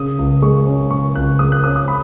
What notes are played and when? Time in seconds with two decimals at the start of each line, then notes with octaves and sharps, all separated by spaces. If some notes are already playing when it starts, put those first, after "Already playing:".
Already playing: C#3 D#6
0.19 C#2
0.42 G#3 C#6
0.67 C#4
0.91 C#3 C#6
1.15 C#2 F#6
1.39 G#3 D#6
1.52 F#6
1.64 C#4 D#6
1.76 D#6
1.88 B5